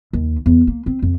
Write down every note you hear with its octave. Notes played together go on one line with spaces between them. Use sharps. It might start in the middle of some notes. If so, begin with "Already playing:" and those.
D#2
E2
A#3
C4
F2